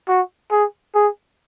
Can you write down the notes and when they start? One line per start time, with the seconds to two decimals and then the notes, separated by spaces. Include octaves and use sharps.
0.08 F#4
0.51 G#4
0.95 G#4